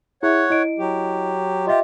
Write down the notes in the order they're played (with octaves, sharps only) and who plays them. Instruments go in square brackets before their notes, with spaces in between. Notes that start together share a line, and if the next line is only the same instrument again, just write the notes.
[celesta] E4 G#4 E5 [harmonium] C#5 F#5
[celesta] E4 D#5 D7
[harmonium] F#3 G4
[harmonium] F4 G4 [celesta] D#5 E5